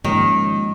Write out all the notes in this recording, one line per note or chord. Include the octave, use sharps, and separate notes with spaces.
G#2 D#3 F3 A#3 C#4